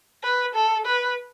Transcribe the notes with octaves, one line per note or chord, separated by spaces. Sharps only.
B4
A4
B4